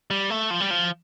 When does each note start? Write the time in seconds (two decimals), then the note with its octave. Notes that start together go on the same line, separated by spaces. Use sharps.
0.11 G3
0.30 A3
0.50 F3
0.60 G3
0.71 F3